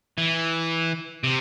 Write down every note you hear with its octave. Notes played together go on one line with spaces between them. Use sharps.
E3
C3